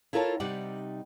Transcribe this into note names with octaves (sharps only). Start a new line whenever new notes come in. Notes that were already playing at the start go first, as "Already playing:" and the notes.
E4 F4 A4 A#4 C#5 A5
C3 G3 D#4 D5 F#5